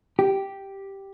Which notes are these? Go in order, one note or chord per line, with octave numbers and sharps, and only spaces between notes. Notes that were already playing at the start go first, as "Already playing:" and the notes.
G4